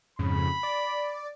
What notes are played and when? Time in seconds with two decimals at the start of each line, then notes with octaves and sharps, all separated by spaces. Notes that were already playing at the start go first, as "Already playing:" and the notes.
0.19 F2 G#2 C#3 B5
0.63 D5